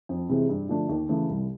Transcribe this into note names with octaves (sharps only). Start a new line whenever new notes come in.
F2
C3 E3 G#3 C4
G2
D3 F3 A3 D4
D#2
C#3 E3 A3
C2